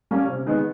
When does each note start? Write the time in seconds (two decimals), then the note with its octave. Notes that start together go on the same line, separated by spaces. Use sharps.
0.11 G3 A#3 C#4
0.28 C3
0.46 D#3 G#3 B3